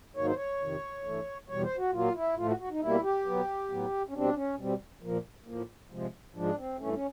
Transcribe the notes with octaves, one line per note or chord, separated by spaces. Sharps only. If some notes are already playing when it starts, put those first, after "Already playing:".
G#2 D#3 F#3 A#3 C#5
C5
C#5
F2 C3 D#3
G2 E3 A3
E2 B2 G3 C#5
C5
F#4
A#2 F#3 A#3 F4
E4
A2 F3 A3 F4
F#4
F#4
D#4
B2 G3 A#3 E4
G4
B2 F#3 B3
A2 F#3 B3
C#4
B2 G3 C4 D4
C#4
B2 G3 C4
A#2 F3 A#3
A2 F3 A#3
C3 F3 G#3
G#2 F3 G#3 D4
C4
G2 E3 A3 C#4
C#4